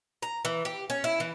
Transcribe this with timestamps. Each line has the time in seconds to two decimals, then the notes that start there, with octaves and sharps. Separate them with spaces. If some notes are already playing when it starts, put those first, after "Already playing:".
0.22 A#5
0.45 E3
0.65 G4
0.90 C#4
1.04 E4
1.20 E3